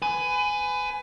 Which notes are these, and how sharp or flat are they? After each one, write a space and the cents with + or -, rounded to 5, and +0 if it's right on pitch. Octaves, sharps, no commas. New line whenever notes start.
B4 +25 G#5 +5